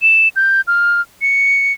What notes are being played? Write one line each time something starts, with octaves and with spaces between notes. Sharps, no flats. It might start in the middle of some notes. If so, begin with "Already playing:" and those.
E7
G6
F6
C#7